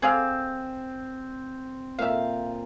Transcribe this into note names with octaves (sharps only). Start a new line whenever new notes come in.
C4 G#4 D5 F5
A#2 E5 F5